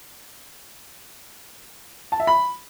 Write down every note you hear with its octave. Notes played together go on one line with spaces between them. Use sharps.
A5
E5
B5